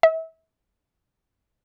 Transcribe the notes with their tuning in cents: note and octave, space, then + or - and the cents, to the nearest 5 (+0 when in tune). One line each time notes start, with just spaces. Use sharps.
E5 -30